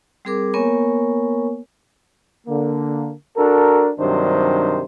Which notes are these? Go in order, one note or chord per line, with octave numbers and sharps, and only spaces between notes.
G3 C4 G#4 A#4 D6
A#3 B3 A#4 C#5 G#5 C#6
D3 A#3
D4 F#4 A4 A#4
G2 C3 D#3 F#3 D4 C5